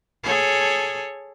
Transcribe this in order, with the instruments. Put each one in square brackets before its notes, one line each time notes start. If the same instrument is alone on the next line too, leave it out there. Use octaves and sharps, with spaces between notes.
[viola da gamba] G#4 A4 C#5